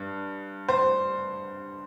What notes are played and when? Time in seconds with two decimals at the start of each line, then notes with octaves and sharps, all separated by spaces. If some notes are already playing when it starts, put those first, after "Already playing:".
Already playing: G2
0.69 C5